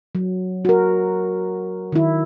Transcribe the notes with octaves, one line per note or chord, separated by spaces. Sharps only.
F#3
F#4 A#4
D#3 E4